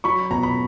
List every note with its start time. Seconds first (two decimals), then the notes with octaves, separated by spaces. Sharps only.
0.04 F#3 B5 C#6
0.31 B2 A#5
0.43 B5